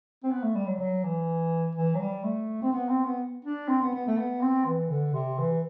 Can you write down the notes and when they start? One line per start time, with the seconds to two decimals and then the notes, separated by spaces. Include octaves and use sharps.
0.23 C4
0.31 B3
0.43 A3
0.55 G3
0.67 F#3
0.79 F#3
1.04 E3
1.75 E3
1.95 F#3
2.00 G3
2.24 A3
2.62 C4
2.72 B3
2.89 C4
3.05 B3
3.45 D4
3.68 C4
3.82 B3
3.93 B3
4.07 A3
4.17 B3
4.41 C4
4.65 E3
4.90 D3
5.13 C3
5.38 E3